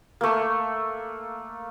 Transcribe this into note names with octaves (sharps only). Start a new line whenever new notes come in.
A3 A#3